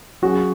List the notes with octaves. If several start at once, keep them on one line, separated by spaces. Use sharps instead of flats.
F#3 C#4 F#4 G#4